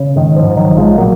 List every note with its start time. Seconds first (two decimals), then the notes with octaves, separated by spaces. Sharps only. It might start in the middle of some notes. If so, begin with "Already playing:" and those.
Already playing: C#3
0.16 G#2 D#3
0.36 F3
0.43 G#2
0.57 D#3 F#3
0.70 A#1
0.77 F3 G#3
0.97 A#2 F#3 A#3